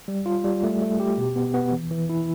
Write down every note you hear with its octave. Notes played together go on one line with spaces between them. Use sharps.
G3
F4
G3
A3
A3
G4
B2
B3
B3
E3
E3
E4